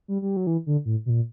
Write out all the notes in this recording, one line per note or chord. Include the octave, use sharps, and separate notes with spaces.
G3
G3
F#3
E3
D3
A2
B2
A#2